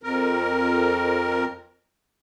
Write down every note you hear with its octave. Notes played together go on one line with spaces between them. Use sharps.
F2 A#4